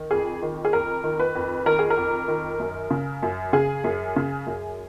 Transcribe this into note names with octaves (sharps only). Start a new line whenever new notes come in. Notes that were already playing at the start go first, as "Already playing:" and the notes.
Already playing: D#3
F2 G#4
D#3
G#4
F2 A#4
D#3
B4
F2
D#3 A#4
G#4
A#4
F2
D#3
F#2
C#3
F#2
C#3 G#4
F#2
C#3
F#2